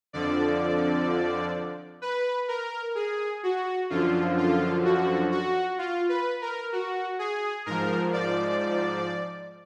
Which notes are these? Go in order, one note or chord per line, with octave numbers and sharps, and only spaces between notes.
F2 D3 F3 D5
B4
A#4
G#4
F#4
F#2 D3 F3 F4
F4
F#4
F#4
F4
B4
A#4
F#4
G#4
G#2 F3 A#4
D5